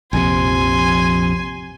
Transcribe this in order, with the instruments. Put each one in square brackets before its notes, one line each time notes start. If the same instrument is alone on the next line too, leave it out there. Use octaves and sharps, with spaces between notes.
[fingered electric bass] A#1 F2 C3 [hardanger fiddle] G#5 C6